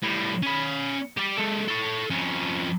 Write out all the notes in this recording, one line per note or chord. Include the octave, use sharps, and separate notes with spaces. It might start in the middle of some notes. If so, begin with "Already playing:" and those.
A2 G3
C#4 B5
G4 D5
G#3 A4
A4 C#5
F2 C#4